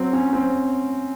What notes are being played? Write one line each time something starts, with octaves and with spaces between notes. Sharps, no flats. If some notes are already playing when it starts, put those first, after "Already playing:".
Already playing: F#3 C4
C#4
C4